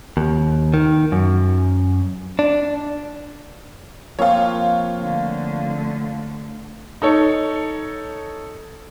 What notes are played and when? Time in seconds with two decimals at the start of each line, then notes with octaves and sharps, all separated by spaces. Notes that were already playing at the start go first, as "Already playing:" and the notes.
0.17 D#2
0.74 D#3
1.12 F#2
2.39 D4
4.19 F3 A#3 C4 F4 C#5
5.01 D3 A3
7.02 D#4 A4 C#5